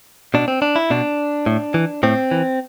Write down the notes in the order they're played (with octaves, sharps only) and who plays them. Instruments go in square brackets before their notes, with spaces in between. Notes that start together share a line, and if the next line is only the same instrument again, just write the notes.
[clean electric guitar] B2 D4
C4
D4
E4
B2 D4
A2
E3
A2 C4
E3